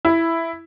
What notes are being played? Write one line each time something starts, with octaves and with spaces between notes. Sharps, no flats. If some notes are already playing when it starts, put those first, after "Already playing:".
E4